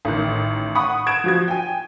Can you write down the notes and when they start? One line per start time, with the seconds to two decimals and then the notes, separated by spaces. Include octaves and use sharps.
0.05 A1 D#3
0.75 F#5 B5 C#6 D#6
1.06 D#6 G#6 D7 E7
1.24 F3 F#4 G#6
1.48 G5 G#5